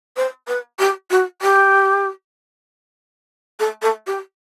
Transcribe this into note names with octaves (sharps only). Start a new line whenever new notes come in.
C5
B4
G4
F#4
G4
A4
A4
G4